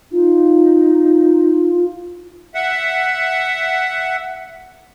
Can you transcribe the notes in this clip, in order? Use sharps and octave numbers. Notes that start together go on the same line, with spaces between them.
D#4 F4
E5 F#5